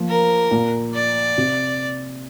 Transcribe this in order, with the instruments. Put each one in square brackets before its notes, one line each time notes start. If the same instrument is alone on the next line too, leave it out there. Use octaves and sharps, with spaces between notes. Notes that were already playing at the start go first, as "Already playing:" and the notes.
Already playing: [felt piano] F3 A#3
[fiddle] A#4
[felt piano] A#2
[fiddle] D5
[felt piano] C3